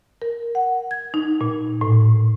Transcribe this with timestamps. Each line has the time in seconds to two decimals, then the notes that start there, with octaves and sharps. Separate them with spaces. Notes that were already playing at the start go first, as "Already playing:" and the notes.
0.22 A#4
0.55 F#5
0.91 G#6
1.14 D#4
1.41 A#2
1.81 A2